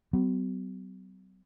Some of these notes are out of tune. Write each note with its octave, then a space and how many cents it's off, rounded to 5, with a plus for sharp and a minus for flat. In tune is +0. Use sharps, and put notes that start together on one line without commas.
F#3 +40 B3 +45